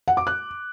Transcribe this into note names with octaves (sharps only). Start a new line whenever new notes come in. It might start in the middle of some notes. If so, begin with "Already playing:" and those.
F#5
D6
F#6